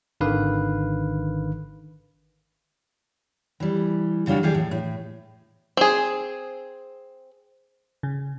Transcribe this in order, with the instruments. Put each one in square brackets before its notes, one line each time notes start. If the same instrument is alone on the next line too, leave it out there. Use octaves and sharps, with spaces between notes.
[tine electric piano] G#1 D3 D#3 B4 F5
[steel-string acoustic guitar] E3 G3
C#3 G3 D4 F4 F#4
E3 G3 G4 G#4
A2
A2
[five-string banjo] C4 G#4
[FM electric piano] C#3